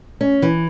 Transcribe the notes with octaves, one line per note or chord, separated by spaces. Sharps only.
C#4
E3